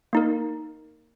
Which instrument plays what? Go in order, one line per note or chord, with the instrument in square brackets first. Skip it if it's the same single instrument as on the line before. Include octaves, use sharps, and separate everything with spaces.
[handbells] A#3 D#4 A#4